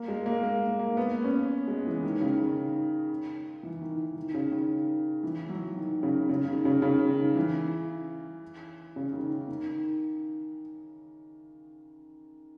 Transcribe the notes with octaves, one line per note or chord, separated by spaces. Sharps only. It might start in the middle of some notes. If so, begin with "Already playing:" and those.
Already playing: A#3
G#3
A#3
A#3
A#3
B3
C#4
G#3
E3
D#3
C#3
D#3
E3
D#3
D#3
D#3
C#3
D#3
E3
F#3
D#3
C#3
C#3
D#3
C#3
C#3
D#3
E3
C#3
D#3
D#3
D#3